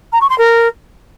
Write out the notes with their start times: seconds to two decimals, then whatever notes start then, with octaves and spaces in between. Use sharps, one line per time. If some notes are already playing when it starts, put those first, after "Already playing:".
0.12 A#5
0.21 C#6
0.30 C6
0.38 A#4